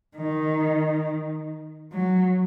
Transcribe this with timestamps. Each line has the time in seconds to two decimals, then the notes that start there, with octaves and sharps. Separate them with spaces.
0.17 D#3
1.92 F#3